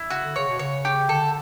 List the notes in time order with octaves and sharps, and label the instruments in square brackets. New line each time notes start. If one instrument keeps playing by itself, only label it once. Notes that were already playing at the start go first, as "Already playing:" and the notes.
Already playing: [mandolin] E4
[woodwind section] C#3 [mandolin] F#4
[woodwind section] D3
[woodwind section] C#3 [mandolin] C#5
[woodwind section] B2
[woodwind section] C#3 [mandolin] C#5
[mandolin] G4
[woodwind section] D3 [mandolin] A4